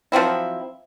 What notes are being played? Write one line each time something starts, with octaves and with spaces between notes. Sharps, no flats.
F3 F#3 C4 E4